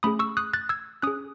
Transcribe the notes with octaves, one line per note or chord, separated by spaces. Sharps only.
A3 C#4 G#4 B5 D#6
C#6 E6
D#6 F#6
F#6 A6
E6 G#6
C#4 G#4 D#6 F#6